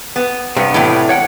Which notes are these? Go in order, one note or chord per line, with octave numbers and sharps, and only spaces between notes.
B3
G2 C3 B3
E2 A2
C#5 F#5 G5